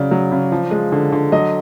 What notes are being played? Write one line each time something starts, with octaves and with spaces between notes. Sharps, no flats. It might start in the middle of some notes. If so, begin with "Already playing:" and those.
Already playing: C#3 F#3 D5
F#3
C#3
F3
G#3
D3
D3
F#3 D#5